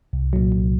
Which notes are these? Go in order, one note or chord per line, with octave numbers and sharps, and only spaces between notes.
C2
A#2 F#3
C2